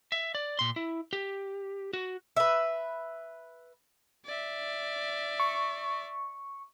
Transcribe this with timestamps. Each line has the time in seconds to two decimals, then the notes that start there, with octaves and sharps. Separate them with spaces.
0.12 E5
0.35 D5
0.59 A#2 C6
0.76 E4
1.13 G4
1.93 F#4
2.37 B4 E5
4.26 D5 E5
5.40 C#6